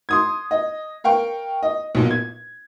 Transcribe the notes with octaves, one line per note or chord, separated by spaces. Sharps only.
C6 D#6 G#6
D#5
A#4 F5 G5 C#6
D#5
B1 A#2
G#6